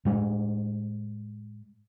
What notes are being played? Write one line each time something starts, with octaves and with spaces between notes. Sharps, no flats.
A2 G3 G#3